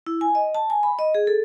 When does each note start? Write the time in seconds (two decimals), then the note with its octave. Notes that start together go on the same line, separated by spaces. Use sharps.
0.07 E4
0.21 G#5
0.35 D#5
0.55 A5
0.70 G#5
0.83 B5
0.99 D#5
1.15 G#4
1.27 A4